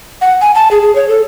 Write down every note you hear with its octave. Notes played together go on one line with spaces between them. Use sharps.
F#5
G#5
A5
G#4
G#4
C#5
A4